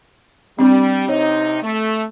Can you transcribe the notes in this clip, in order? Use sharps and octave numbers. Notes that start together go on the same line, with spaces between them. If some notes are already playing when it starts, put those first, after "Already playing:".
G3 C4 D4
C3 D#4 C#5
A3